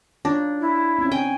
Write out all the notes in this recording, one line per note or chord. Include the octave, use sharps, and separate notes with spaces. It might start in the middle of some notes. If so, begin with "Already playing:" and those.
D4 D#4 F4 C#5
E4
C4 C#4 D#4
C4 G5 G#5